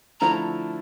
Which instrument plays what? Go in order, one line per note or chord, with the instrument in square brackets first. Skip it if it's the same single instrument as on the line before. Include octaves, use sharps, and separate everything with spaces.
[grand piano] D3 F3 A3 E4 [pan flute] A#5